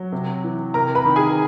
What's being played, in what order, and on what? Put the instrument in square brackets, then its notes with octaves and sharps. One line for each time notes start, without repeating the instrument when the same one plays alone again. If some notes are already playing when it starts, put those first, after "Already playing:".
Already playing: [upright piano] F#3
C3
E3
C3 A#4 A#5
B4 B5
D#3
G#4 G#5